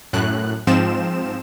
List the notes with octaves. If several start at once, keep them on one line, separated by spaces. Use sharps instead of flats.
F#2 A2 F#6
G#2 F3 C4 E7